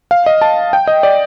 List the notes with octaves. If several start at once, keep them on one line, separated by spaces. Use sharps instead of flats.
F5
D#5
A5
G5
D#5
D5